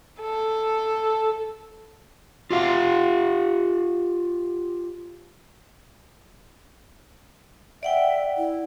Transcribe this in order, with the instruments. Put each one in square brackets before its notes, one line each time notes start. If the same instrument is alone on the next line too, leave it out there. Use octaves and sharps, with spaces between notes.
[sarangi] A4
[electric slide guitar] F4 G4 F5
[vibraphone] D5 F#5 G5 [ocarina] E5
[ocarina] E4